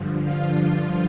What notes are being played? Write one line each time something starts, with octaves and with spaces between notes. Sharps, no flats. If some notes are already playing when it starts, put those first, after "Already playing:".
Already playing: G2 D3 F3
F4